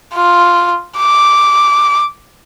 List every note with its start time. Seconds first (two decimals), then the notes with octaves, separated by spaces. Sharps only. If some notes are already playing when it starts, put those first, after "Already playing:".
0.14 F4
0.97 D6